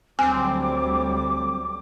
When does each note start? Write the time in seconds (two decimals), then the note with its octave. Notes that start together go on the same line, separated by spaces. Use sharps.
0.19 D2 F#3 G3 C4 G#5 D6